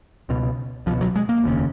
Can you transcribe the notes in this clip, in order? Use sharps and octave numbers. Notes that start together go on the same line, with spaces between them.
C#2 B2
C#2 B2 F3
F#3
G#3
A#3
F1 D#2 C#3